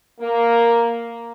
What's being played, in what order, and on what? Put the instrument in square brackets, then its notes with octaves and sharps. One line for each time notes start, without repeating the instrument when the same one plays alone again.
[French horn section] A#3